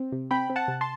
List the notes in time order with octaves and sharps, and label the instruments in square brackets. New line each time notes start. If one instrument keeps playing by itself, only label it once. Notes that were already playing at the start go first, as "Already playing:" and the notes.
Already playing: [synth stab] C4
C3
C4 G5 B5
C4
F#5 A5
C3
A5 C6